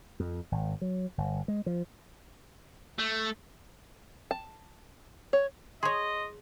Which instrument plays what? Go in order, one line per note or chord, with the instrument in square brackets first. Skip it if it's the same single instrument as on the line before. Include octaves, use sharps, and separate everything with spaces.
[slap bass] F2
G#1
F#3
G1
G#3
F3
[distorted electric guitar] A3
[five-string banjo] A5
C#5
[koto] G#4 C#5 [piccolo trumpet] D#5 [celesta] C6